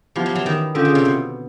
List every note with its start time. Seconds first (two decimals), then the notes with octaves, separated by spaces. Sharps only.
0.16 F3 B3 E4 G4
0.26 F#3
0.35 E3
0.46 D#3
0.75 D3 C#4 F4 A4
0.85 C#3
0.95 C3
1.05 B2